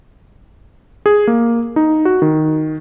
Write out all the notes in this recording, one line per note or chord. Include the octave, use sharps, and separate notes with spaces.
G#4
A#3
D#4
F#4
D#3